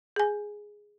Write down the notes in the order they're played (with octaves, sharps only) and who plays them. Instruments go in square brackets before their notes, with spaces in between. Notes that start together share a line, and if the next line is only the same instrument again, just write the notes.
[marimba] G#4 G#5